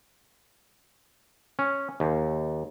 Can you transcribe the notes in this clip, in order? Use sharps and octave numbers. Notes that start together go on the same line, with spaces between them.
C#4
D#2